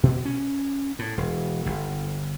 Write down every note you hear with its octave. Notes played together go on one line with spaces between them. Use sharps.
B2
C#4
A2
E1
G1